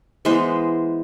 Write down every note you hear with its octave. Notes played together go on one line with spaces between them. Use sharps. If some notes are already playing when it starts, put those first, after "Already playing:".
E3 G#3 B3 C5